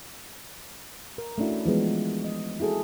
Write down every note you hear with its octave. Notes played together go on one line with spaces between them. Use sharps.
A#4
A3 C#4 D4 E4 F#4
E3 F3 G#3 B3
D#5
C4 E4 F#4 G#4 A4